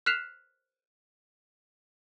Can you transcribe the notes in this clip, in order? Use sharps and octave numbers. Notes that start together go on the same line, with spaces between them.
F6 F#6 B6 C7 E7 F7